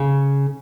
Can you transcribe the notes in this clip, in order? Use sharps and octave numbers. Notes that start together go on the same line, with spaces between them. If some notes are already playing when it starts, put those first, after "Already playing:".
Already playing: C#3